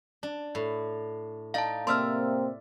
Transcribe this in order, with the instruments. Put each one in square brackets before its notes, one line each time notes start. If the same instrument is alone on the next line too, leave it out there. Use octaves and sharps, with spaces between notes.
[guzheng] D4
A2
[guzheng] D#4 D5 [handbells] F5 A5
[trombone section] C3 A#3 C4 [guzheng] D5 E5 [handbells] C6 E6 F6